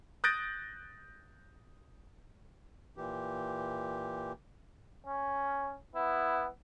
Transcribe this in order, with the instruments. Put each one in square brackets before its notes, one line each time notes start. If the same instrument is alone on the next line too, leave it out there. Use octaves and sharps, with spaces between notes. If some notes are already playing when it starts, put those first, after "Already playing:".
[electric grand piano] D#6 F#6 G6 A6 A#6 D7
[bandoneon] A#2 E3 G4
[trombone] C#4
[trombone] B3 [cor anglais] E4